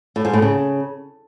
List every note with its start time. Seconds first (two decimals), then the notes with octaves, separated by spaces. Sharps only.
0.16 A2
0.25 G#2
0.33 A2
0.42 C#3